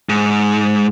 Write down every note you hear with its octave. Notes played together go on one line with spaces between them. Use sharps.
G#2